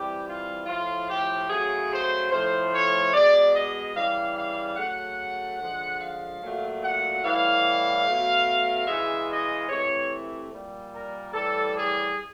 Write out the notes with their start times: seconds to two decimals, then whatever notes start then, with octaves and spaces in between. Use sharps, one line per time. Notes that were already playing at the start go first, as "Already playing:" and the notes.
Already playing: C3 E3 G3 G4
0.26 F4
0.66 A2 F3 A3 F4
1.08 G4
1.49 C#3 F#3 A3 G#4
1.90 C5
2.30 A2 F3 A3 C5
2.72 C#5
3.13 B2 G#3 D5
3.53 D#5
3.95 C#3 E3 G3 F5
4.36 F5
4.76 C#3 F#3 A3 F#5
5.59 D3 F3 G#3
6.00 F5
6.42 A#2 F#3 A3
6.82 F#5
7.22 A2 E3 G3 F5
8.05 B2 F#3 A3
8.86 C#3 E3 G#3 E5
9.28 D#5
9.69 C3 E3 A3 C#5
10.52 A#2 G3
10.92 A#4
11.33 A2 E3 G3 A4
11.74 G#4